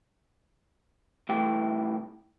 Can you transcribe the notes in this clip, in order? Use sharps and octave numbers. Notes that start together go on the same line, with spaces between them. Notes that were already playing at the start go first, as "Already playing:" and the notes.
C2 A2 E3 E4 G5